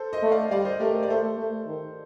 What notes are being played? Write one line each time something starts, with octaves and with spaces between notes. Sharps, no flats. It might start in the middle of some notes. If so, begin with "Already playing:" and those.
Already playing: A4 C5
C5 D#5
A3
D5 F5
G3 D5 F5
C5 D#5
A3 G4 A#4
C5
D5
A3 A4 C5
A3
D#3